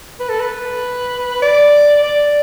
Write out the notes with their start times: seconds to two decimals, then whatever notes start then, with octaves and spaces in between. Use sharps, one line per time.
0.20 B4
0.29 A4
0.40 B4
1.42 D5
2.03 D5